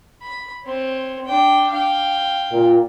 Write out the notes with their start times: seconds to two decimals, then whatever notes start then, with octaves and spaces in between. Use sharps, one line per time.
0.22 B5
0.64 C4 C#5
1.26 D4 G5
1.71 F5 G5
2.50 A#2